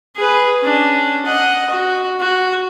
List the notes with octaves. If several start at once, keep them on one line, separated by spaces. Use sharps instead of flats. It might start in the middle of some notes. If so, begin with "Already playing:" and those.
G#4 B4
C#4 D4
D#5 F#5
F#4
F#4